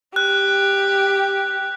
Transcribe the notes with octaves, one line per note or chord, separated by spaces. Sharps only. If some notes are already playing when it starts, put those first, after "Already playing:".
G4 F#6